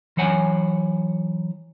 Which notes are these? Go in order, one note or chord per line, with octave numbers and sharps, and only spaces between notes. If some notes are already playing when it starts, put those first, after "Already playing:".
E3 F#3 C#5 F#5 G#5